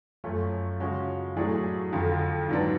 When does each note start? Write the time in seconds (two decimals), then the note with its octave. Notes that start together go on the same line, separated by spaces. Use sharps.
0.24 F#2 F3 A3 C#4
0.80 C#3 F3 G#3 C#4 F#4
1.36 A2 F#3 A3 D4 G#4
1.92 F2 D3 F3
2.49 G#2 F#3 B3 D4